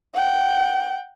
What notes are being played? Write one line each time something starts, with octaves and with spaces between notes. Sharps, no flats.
F#5 G5